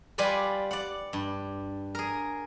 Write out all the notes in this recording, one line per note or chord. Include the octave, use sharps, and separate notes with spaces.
G3 F4 B4 D5 G#5
D5 F#5
G2
G#4 A#4